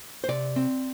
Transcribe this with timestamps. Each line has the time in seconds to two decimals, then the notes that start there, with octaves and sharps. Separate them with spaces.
0.24 C5
0.28 C3 D5
0.56 C4